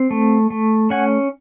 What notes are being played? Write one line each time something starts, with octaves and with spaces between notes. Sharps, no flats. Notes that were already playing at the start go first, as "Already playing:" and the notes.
Already playing: C4
A3
A3
C#4 F#5 G#5